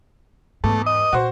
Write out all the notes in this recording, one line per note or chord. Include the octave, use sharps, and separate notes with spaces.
E2 G#2 A3
D#5
A#2 F#4 C5